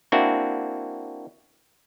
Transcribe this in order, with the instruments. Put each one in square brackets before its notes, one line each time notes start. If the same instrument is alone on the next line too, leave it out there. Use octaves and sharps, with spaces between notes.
[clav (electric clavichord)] A#3 C4 D4 E4 F#4